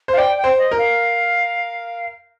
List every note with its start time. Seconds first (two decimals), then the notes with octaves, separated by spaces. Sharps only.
0.08 C5 F5
0.17 D5 G5
0.38 G5
0.44 C5
0.58 D#5
0.71 A#4
0.78 F5